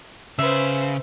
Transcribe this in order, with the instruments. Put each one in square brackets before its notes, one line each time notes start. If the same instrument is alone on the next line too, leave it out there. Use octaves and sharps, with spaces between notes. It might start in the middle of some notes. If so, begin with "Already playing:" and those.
[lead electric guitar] C#3 [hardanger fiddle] B4 C5 [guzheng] E5